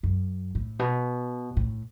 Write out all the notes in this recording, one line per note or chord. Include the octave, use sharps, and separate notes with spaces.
F#2
A2
B2
A2